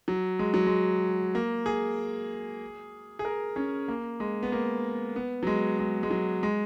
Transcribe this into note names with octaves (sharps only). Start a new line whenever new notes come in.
F#3
G#3
F#3
G#3
A#3
G#4
G#4
A#4
C#4
A#3
G#3
B3
A#3
B3
F#3
G#3
G#3
G#3
F#3
G#3